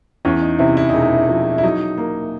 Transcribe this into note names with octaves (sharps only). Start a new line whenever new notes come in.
E2 C#4
D#4
C3 E4
E4
E1 D#4
E4
F3
E4
F#3 D#4
A#3